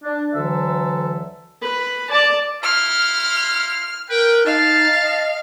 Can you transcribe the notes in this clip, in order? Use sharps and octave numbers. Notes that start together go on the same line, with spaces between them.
D4
D2 D3 E3 F#3 A4 E5
B4 B5
D5 A5
E4 F5 C6 F6
A#4 B4 G5
D#4 F5 A5
D#5